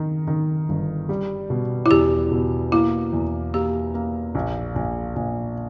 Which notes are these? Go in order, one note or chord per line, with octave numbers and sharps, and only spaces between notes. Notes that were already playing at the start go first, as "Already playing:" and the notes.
Already playing: D#3
D#3
G1
G3
B2
E4
E2 G4
B2
A#3 E4
E2
A#3 G4
A#3
A#1
A#1
A#1